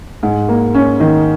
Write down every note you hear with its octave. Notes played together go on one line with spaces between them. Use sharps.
G#2
A#3
C#4
D#3